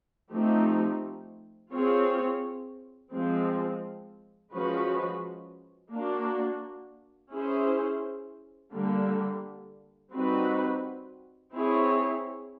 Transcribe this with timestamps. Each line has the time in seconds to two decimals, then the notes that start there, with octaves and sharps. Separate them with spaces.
0.32 F3 A3 C4 D#4 G4
1.72 C4 F4 G#4 C#5
3.12 F3 G#3 C4
4.52 F3 G#3 C#4 F#4 B4
5.93 A#3 D4 F#4
7.32 C#4 E4 G#4 C5
8.73 D3 G3 A#3
10.13 G3 C4 D#4 F#4 B4
11.53 C4 E4 G#4 C#5